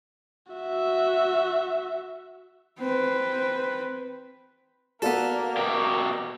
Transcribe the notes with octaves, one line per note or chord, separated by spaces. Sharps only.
F#4 E5
C4 B4
A#3 B3 F#4 A4 D5 F5
B2 G4